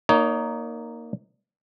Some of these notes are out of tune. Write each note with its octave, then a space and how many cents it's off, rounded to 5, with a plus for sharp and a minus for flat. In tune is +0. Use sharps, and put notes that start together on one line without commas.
A#3 +0 D#4 -5 C#5 +30